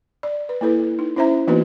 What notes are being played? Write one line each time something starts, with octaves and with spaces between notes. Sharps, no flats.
D5
B4
A#3 E4 A4 B4
D#4
C#4 E4 C5 E5 A#5
E3 A#3 B3 D#4 F#4 B4